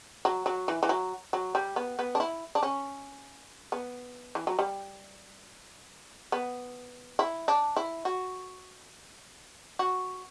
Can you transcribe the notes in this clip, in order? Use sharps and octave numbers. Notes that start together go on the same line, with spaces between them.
F#3
F#3
E3
E3
F#3
F#3
G3
B3
B3
D4
E4
D4
C#4
B3
E3
F#3
G3
B3
E4
D4
E4
F#4
F#4